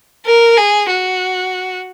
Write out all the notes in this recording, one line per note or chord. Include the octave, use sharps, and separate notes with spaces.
A#4
G#4
F#4